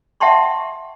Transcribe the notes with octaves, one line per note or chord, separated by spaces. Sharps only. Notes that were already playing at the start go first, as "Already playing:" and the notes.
E5 F#5 G5 A5 C6 C#6